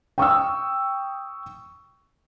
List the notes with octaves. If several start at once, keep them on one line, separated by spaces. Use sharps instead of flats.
G5 C#6 D#6 E6